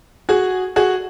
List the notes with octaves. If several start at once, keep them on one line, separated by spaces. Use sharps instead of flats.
F#4 G#4
F#4 G#4